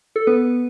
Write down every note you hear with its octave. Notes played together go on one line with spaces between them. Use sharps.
A4
B3 B4